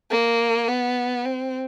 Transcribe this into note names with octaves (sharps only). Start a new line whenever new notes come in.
A#3
B3
C4